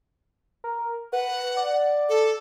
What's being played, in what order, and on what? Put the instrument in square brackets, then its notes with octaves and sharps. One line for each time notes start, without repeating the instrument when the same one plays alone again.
[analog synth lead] A#4
[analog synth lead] B4 [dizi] F#5
[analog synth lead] D5
[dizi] A4